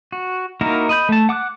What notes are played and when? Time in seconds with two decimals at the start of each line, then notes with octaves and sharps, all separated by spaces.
0.12 F#4
0.61 A#3 D#4 E4 F#4 A#4
0.89 D#5 B5 G6
1.09 A3 A5
1.29 F#5 D6 D#6 F#6